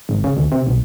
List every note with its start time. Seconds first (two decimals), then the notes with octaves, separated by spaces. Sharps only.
0.09 G#1
0.24 C#3
0.37 D2
0.52 C3
0.67 B1